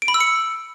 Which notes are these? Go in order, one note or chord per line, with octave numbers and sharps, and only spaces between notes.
D7
B5
E6
C#7